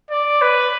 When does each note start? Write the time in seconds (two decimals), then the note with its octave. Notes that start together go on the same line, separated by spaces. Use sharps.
0.10 D5
0.42 B4